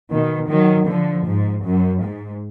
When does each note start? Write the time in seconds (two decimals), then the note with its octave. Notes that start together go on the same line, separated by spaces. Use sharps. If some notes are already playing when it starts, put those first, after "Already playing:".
0.11 B2 D#3
0.49 D#3 F#3
0.88 D3 F3
1.26 G#2
1.65 F#2
2.03 G#2